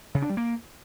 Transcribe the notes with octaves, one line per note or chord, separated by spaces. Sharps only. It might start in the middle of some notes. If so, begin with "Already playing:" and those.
C#3
D4
G3
A#3